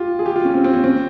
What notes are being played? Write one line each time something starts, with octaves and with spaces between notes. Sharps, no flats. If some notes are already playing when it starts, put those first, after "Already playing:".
Already playing: F4 G4
G#4
G4
F4
C#4
C4
C4
C#4
C4